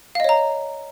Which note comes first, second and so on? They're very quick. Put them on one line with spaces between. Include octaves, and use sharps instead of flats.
F5 D#5 C#5 A#5